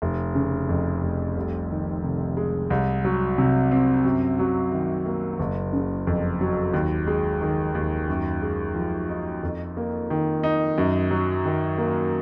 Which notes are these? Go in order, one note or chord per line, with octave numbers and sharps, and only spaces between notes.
F1
C#3
F2
F1
C2
D#3
C3
G#3
C2
F#3
C3
C4
F#2
F#3
D#3
A#3
F#1
C#3
F2
F#3
D#2
G#3
D#3
D#2
F#2
G#3
F3
D#4
F2
A#3
D#3
D#4
F#2
F#3
D#3
A#3